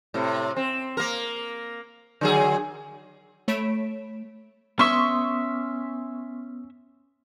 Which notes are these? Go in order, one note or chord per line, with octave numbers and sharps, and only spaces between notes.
A2 C3
C4
A#3 A#4
D3 F#3 G#4
A3 C#5 B5 B6 D7 E7
B3 C#4 E5 C6 C#6 D#6